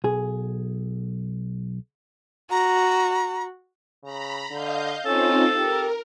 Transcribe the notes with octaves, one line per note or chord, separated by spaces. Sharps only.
B1 G#4
F#4 A#5
C#3 A#5 B5
D3 D#5 F5 G6
C4 C#4 D#4 F4 A4
G4 A#4